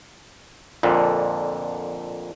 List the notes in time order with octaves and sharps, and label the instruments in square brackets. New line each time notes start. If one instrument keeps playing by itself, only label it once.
[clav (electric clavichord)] F2 A#2 D3